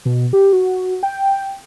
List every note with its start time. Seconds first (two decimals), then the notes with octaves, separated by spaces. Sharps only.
0.05 B2
0.33 G4
0.53 F#4
1.03 G5